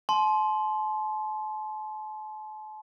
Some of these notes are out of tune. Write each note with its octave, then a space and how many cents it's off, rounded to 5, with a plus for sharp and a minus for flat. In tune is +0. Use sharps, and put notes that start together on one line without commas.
A5 -40 C6 +0